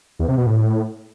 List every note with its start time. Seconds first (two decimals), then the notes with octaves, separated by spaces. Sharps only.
0.19 E2
0.28 C3
0.37 B2
0.47 A2